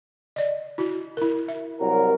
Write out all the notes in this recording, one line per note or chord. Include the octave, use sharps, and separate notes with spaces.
D5 D#5
E4 F#4
E4 A#4
E5
C2 F#3 A#4